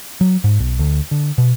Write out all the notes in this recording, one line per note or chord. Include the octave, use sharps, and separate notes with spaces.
F#3
G#2
B1
D2
D3
B2